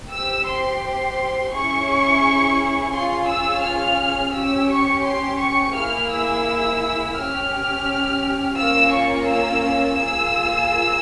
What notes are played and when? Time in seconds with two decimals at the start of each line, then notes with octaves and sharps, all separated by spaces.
0.11 C4 G4 E6
0.46 C6
0.82 C6
1.51 C#4 E4 G#4 C#6
2.93 C#4 F4 G#4 C6
3.28 E6
3.63 F6
4.33 C#4 G4 E6
4.69 C#6
5.04 C6
5.38 C#6
5.73 A#3 E4 G#4 F6
6.10 E6
7.15 C#4 G4 F6
8.55 A#3 C#4 F4 E6
8.90 C#6
9.26 E6
9.97 A#3 F4 G#4 E6